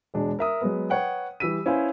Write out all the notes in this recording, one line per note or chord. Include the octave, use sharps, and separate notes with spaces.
E1 G#3 D4
A#4 E5 D#6
F#3 G#3 B3
B4 C#5 F#5 G5
E3 G3 E6 B6 D#7
C#4 E4 B4 C5 F5 G#5